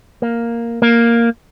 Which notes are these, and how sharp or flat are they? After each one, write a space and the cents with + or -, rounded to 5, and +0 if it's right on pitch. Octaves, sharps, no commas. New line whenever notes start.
A#3 +0
A#3 +0